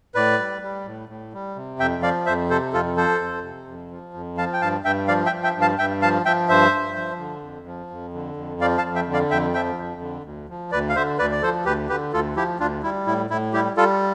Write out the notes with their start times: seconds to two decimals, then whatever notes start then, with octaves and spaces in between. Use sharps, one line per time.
0.15 A2 B4 D5
0.39 G3
0.62 G3
0.86 A2
1.09 A2
1.33 G3
1.56 C3
1.79 F2 E5 G5
2.03 F3 D5 F5
2.26 F2 C5 E5
2.50 C3 A4 C5
2.73 F2 F4 A4
2.97 F3 A4 C5
3.20 F2
3.43 C3
3.67 F2
3.91 F3
4.14 F2
4.37 F3 F5 A5
4.53 G5
4.61 G2 F5 A5
4.84 G2 E5 G5
5.08 F3 D5 F5
5.26 E5 G5
5.32 F3
5.43 E5 G5
5.56 G2
5.61 F5 A5
5.78 G2 E5 G5
6.02 F3 F5 A5
6.25 F3 E5 G5
6.49 G2 C5 E5
6.72 G2
6.96 F3
7.19 D3
7.43 F2
7.67 F3
7.90 F2
8.14 D3
8.37 F2
8.61 F3 D5 F5
8.78 F5 A5
8.83 F2
8.95 E5 G5
9.07 D3
9.13 D5 F5
9.31 F2 E5 G5
9.54 F3 E5 G5
9.79 F2
10.01 D3
10.24 D2
10.49 F3
10.72 D2 B4 D5
10.89 F5
10.95 D3 C5 E5
11.19 D2 B4 D5
11.31 D5
11.42 F3 A4 C5
11.65 D2 G4 B4
11.89 D3 G4 B4
12.13 D2 F4 A4
12.36 F3 E4 G4
12.60 D2 D4 F4
12.83 G3 E4
13.07 A2 E4
13.30 A2 E4
13.53 G3 E4 G4
13.77 G3 F4 A4